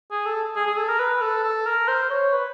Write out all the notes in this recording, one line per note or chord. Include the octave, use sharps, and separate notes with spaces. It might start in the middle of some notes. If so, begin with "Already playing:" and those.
G#4
A4
G#4
G#4
A4
A#4
B4
A4
A4
A#4
C5
C#5
B4